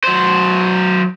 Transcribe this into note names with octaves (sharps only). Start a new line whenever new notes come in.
F#3 C5